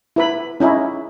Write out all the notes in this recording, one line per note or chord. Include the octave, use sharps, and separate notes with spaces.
E4 B4 B5
C#4 D#4 E4